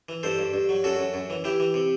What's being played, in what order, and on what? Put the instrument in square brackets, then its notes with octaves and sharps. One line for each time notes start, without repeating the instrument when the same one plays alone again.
[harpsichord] E3
G2 A4 C5
G2
G2
F#3
F#2 F#4 A4
F#2
F#2
E3
E3 E4 G4
E3
C3